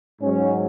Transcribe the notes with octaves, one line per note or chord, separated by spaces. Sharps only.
G#2 F#3 C#4